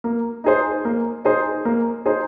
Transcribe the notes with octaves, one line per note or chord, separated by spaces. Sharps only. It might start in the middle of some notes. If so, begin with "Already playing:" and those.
A#3
D#4 G#4 C5
A#3
D#4 G#4 C5
A#3
D#4 G#4 C5